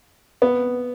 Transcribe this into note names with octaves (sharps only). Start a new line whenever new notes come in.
B3